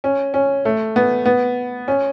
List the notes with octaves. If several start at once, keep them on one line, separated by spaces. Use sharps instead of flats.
C#4
C#4
A3
B3
B3
C#4